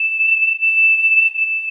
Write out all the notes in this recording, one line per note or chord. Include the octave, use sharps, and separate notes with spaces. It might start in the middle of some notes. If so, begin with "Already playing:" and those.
Already playing: E7
E7
E7